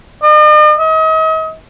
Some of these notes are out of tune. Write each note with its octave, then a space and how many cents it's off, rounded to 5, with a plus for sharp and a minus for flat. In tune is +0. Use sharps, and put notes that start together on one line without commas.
D#5 -45
D#5 +40